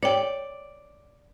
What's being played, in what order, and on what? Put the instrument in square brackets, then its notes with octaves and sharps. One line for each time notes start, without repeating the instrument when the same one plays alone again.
[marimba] C#5 G5 [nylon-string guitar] D5